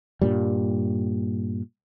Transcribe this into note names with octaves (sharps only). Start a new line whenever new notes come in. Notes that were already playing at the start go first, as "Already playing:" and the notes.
G2 A#2 G3